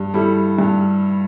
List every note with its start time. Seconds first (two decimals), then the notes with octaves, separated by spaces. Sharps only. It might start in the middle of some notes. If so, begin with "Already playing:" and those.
Already playing: G2
0.14 G3 E4 A4
0.59 G2